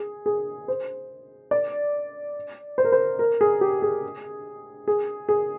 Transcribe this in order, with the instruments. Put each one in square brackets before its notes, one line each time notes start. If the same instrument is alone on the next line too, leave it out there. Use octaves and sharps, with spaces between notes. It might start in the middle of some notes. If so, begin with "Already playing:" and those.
Already playing: [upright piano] G#4
G#4
C5
D5
C5
A#4
C5
A#4
G#4
G4
G#4
G#4
G#4